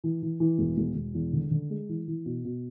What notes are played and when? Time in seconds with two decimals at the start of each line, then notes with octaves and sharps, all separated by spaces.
0.04 E3
0.22 E3
0.40 E3
0.59 E1
0.78 E1
0.95 E1
1.14 E2
1.33 D3
1.51 D3
1.70 G#3
1.89 E3
2.08 E3
2.26 B2
2.45 B2